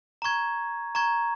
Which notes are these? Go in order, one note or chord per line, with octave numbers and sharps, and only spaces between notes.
A#5 C#6 G#6
A#5 C#6 G#6